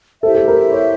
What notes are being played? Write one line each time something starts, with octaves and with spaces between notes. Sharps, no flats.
E4 G4 A4 C5 E5
A4
A#4
C#5